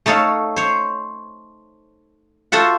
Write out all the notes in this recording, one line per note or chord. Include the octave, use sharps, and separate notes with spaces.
A3 D#4 A4 C#5 F5
C5 C#5
F4 F#4 A4 C5 E5 F#5